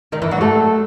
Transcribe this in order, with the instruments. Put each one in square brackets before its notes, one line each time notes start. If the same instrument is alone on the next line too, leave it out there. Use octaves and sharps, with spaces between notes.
[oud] D#3 D#4
E3 E4
F#3 F#4
A3 A4